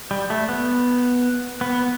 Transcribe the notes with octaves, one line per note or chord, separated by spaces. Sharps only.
G3
A3
B3
B3